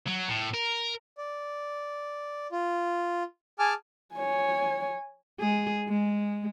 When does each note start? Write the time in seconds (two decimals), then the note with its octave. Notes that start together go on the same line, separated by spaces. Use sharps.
0.08 F#3
0.29 A2
0.54 A#4
1.18 D5
2.52 F4
3.59 G#4 G#5 A5 D6 F6
4.15 C#5 G#5
5.40 G#3 G#4
5.89 G#3